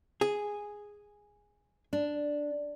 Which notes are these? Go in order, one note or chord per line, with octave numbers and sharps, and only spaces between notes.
G#4
D4